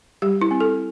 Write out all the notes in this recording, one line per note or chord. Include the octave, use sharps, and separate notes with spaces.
G3 G4
E4
C4
A4